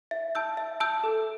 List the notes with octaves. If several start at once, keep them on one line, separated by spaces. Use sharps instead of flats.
E5
A5 E6 G6
E5
A5 E6 G6
A4